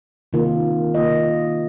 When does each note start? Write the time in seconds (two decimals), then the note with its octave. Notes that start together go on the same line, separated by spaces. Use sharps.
0.33 C3 D#3 A#3 F4
0.94 C3 D#3 A#3 F4 D#5